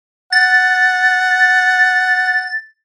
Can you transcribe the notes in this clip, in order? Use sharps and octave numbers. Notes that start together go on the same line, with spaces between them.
F#5 A6